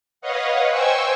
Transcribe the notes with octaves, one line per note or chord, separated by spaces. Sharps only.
B4 C#5 D#5 F5 F#5
C5 G5 G#5 C#6 E6